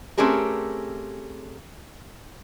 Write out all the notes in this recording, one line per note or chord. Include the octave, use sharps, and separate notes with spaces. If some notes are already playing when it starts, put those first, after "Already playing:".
A3 C4 C#4 G4 G#4 A#4